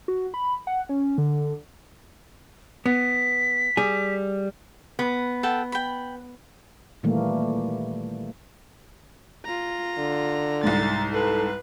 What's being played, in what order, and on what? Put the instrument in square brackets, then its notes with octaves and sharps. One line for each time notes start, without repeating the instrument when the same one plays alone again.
[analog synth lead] F#4
B5
F#5
C#4
D3
[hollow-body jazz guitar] B3 [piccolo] B6
[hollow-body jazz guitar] G3 G#4
[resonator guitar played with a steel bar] B3
[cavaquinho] A4 F#5 G5
G5 B5
[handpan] A#2 D#3 E3 G3 A3 A#3
[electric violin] F4 A#5
[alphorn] D3
[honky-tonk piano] C2 G#2 [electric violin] A6
[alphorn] A4 [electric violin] B4